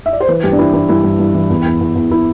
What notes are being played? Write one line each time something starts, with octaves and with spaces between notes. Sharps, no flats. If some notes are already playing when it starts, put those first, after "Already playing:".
E5
D5
C5
E3 B4
G2 G4
D4
E3 E4
E3 E4
G2 E4
G2
G2
E3
E2
E2
E2
E2
E4